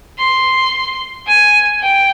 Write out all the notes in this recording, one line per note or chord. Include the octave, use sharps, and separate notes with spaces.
C6
G#5
G5